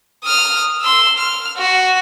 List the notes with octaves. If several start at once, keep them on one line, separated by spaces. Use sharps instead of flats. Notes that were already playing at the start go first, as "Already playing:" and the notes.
D#6 F6
C6 E6
F6
F#4